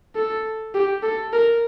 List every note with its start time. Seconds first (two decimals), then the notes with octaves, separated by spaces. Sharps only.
0.16 A4
0.74 G4
1.03 A4
1.33 A#4